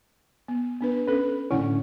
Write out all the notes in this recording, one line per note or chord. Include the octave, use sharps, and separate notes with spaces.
B3
B3 D4 B4
C#4 A4 B4
A2 D3 C#4 E4 F#5